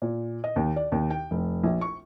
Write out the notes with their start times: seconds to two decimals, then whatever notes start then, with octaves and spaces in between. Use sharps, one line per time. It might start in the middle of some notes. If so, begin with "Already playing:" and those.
0.02 A#2
0.44 D#5
0.56 D#2
0.76 D5
0.92 D#2
1.10 G5
1.31 F1
1.64 A#1
1.81 C#6